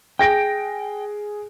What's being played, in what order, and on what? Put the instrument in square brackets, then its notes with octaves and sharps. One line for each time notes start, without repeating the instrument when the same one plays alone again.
[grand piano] G#4 A#6 D7 [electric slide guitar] G5